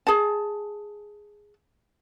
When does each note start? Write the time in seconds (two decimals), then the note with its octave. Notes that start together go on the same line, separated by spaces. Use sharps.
0.07 G#4 A5